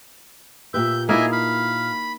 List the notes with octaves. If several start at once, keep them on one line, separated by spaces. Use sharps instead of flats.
A#2 G4 B4 E5 G6
A#3 D#4 E4 G#4 D#5 E5 G#5
F5 B5